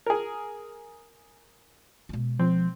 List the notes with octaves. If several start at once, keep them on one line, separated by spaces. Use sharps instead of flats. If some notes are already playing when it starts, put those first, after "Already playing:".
G#4 A#4
B2 G#3
F3 C4